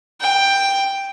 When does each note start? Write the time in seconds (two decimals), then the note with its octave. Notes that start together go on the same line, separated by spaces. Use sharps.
0.21 G5